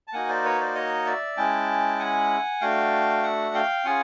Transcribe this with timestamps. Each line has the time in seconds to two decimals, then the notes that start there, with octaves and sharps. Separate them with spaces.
0.07 A5
0.13 A#3 D#4 F#4 F#5 G#5
0.29 C5 D5
0.44 B4 C#5
0.60 C5 D5
0.75 C#5 D#5
1.06 D5 E5
1.37 G#3 C#4 E4 G5 A5
1.99 F#5 G#5
2.61 A3 D4 F#4 F5 G5
3.23 E5 F#5
3.54 F5 G5
3.85 C#4 F4 G#4 F#5 G#5